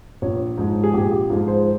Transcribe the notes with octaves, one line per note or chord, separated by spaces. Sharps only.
A#1 C#5
G#2 F3 G#3
G#4
A#1 G4
G4
G#2 F3 G#3 F4
C5